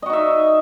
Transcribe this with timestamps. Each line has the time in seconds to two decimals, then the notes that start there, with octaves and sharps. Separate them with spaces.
0.02 D#5
0.06 F#4
0.10 D#4
0.13 E5